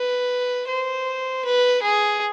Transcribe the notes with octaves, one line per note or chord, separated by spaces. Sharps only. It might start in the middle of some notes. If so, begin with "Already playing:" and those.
Already playing: B4
C5
B4
G#4